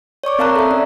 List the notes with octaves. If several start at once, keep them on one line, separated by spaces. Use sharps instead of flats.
C#5 D5 C#6 D6
C4 A#4 F5 A5 A#5 F#6
A4 E5
C#4 D5